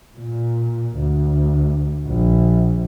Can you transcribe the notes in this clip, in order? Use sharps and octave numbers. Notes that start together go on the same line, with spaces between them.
A#2
D2
A#1